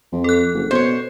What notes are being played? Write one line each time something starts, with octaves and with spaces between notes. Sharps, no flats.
F2
A4 F#6
F#1
B2 C5 C#5